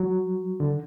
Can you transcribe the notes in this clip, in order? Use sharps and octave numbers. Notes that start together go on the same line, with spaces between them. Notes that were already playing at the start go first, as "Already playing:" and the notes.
Already playing: F#3
D3